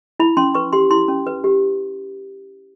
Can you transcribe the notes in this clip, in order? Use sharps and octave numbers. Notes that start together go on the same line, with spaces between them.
E4 B5
C#4 C6
B4 C#6
G4 C6
E4 C6
C#4
B4
G4